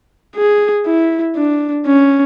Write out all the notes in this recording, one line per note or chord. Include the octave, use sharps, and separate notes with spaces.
G#4
E4
D4
C#4